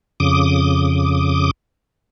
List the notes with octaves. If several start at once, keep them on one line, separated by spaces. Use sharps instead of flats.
F2 C#3 D6 D#6